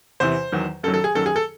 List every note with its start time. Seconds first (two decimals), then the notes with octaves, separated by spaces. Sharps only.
0.20 E2 C3 E3 C5
0.52 E2 D#3 F#3
0.83 F#2 D#3 F#3 A4
0.94 A4
1.04 G#4
1.15 F#2 D#3 F#3 A4
1.26 G#4
1.36 A4